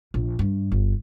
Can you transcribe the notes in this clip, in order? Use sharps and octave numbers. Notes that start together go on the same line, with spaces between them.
A#1
G2
G1